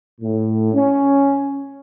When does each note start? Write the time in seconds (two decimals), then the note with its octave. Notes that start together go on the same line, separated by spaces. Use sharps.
0.20 A2
0.74 C#4